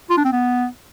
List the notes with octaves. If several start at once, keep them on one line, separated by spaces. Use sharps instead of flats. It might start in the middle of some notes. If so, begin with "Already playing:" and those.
F4
D4
C4
B3